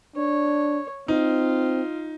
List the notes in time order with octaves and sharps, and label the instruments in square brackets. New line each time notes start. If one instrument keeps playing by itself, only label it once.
[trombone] D4 [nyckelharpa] C#5
[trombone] C4 [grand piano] D#4 [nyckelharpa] F4